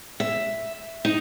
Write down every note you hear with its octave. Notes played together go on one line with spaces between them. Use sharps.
E5
D#4